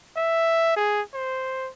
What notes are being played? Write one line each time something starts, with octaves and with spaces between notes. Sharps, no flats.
E5
G#4
C5